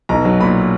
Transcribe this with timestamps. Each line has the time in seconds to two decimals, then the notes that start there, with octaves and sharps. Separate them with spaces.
0.09 B1 A#5
0.25 F#3
0.40 A#2 B5